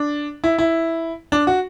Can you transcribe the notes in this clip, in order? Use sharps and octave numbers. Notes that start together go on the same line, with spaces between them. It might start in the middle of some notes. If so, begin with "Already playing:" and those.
Already playing: D4
E4
E4
D4
F#4